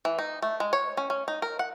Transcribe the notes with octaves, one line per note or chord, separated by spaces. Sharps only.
E3
D#4
A3
G#3
C#5
C#4
C#4
D#4
A#4
F#5